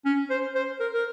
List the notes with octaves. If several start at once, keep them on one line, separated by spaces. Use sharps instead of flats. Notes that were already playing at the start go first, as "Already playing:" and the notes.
C#4
C5
C5
A#4
A#4